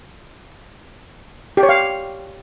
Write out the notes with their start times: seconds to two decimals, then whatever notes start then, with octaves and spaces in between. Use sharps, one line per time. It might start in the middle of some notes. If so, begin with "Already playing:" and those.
1.57 G4
1.63 C#5
1.69 F5